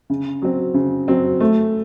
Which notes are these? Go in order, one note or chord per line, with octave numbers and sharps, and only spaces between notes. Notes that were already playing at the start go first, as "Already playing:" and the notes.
C#3
F#3 C4
C#3
F#3 C4
A3